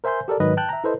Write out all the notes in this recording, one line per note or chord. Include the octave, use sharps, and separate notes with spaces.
A#4 C5 E5 G#5 C6 G6
G4 A4 A#4 D5
G#2 D#3 F#3 B4 D#5
G5 A5 F#6 G6
E5 A#5
E4 A4 B4 C5 D#5